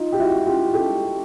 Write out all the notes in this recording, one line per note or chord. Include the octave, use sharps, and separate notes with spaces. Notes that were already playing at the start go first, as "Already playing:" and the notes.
Already playing: D#4 F4
G4
E4 F#4
F4 G4
G4 A4